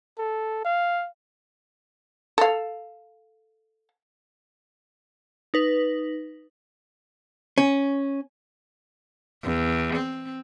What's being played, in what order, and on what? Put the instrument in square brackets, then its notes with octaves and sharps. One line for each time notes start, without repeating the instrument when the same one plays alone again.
[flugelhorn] A4
F5
[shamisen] A4 F5
[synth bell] D#4 B4
[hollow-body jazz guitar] C#4
[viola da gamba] E2
C4